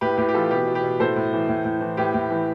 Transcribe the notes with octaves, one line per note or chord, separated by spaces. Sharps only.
A2 G4 B4
A2 G4 B4
G4
E3 F4 A4
B2 G4 B4
B2
G4 B4
B2
A2 A4 C5
A2
E3
A2
A2
E3
A2 G4 B4
A2
E3